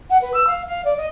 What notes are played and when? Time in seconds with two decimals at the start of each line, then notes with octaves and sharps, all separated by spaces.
0.10 F#5
0.21 B4
0.34 E6
0.47 F5
0.67 F5
0.85 D5
0.97 D#5